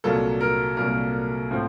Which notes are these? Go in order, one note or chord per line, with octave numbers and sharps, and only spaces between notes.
C2 A#2 F#3 A#3 A4
A#4
C2 A#2 F#3 A#3 A#4
A2 F3 C4